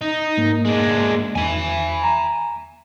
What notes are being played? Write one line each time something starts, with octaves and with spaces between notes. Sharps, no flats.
D#4
G#2 A#3
G#3 D4
E2 G#5 B5
A#5